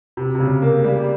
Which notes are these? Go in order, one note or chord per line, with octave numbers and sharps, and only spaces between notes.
C3
C3
C#3
A#3
G3